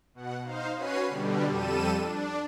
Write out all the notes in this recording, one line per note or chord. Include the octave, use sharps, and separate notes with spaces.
B2 F#5
D#4 C5 F5
C#4 F#4 B4 C#5 C7 D#7
B2 D3 G3
F2 G3 A4 D#7 E7
D4